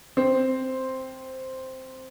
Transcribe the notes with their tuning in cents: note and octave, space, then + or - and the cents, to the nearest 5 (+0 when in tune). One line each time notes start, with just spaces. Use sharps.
C4 +0